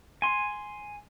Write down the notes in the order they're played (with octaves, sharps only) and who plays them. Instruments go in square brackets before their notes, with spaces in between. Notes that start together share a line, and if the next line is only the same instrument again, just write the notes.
[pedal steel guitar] G#5 C6